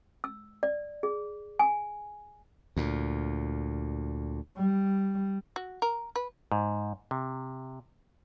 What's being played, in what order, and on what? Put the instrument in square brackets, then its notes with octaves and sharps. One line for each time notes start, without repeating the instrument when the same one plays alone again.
[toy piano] E6
D5
G#4
G#5
[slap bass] D2 A#2
[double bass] G3
[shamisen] F#4
A#4
B4
[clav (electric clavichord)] G#2
C3